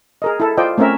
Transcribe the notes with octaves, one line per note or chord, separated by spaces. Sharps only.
G#4 A#4 D#5
E4 A4
F4 C5 D5 D#5 G5
A3 C4 C#4 A#4 E5